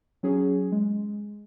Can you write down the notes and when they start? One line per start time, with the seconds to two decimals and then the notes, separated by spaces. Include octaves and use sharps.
0.23 F#3 C#4 G#4
0.72 G#3